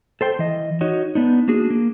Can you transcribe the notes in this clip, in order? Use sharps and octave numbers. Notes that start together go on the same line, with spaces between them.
A4 C5 G5
E3 D#5
D#4 F#4 C#5 D#5
B3 D4 D#4
A#3 D4 F#4 G#4
A#3